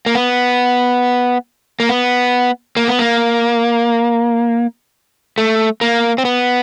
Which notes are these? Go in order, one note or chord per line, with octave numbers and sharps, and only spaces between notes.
A#3
B3
A#3
B3
A#3
B3
A#3
A3
A#3
C4
B3